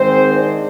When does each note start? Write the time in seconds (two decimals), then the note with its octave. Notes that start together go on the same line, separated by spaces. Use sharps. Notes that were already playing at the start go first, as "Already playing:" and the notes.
Already playing: G#2 D#3 G#3 C4 C5
0.35 D4 D5